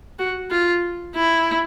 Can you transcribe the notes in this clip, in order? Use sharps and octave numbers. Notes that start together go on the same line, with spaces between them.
F#4
F4
E4